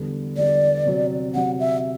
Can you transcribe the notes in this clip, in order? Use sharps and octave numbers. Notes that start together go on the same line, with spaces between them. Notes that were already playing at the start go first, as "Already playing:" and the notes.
Already playing: E2 D3 G3 B3
E2 D3 G3 B3 D5
C3 F#3 C4
C3 F#3 C4 F#5
E5